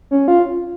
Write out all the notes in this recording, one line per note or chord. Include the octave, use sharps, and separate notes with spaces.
C#4
F4